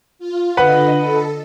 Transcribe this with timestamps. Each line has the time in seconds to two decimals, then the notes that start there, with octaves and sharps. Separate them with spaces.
0.19 F4
0.57 D3 B4 D#5 F#5 B5
0.98 A4